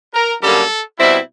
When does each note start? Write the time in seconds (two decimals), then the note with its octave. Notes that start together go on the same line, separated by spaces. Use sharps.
0.14 A#4
0.42 F#2 D3 G3 A#3 D4 A4
0.99 B2 G3 C4 E4